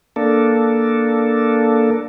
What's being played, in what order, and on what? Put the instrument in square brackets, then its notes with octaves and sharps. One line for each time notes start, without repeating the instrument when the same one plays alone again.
[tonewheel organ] A#3 D4 A4